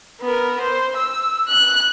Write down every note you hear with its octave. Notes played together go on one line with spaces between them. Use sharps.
B3 A#4
C5
E6
F#6